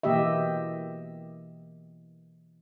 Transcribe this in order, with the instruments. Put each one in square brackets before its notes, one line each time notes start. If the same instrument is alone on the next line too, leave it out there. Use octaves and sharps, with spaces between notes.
[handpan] B2 E3 A#3 G4 D#5 E5